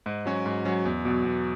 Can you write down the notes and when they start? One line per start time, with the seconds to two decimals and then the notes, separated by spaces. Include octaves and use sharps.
0.06 G#2
0.26 F#3 C#4 F#4
0.46 G#2
0.65 F#3 C#4 F#4
0.85 E2
1.05 B2 F#3
1.25 E2